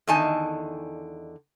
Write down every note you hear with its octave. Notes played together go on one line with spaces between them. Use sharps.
E2 D3 D#3 D#4 G#5 A5